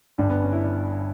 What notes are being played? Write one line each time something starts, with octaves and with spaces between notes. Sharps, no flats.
G1 G2 D3 G3
B3
C#4
E4
D4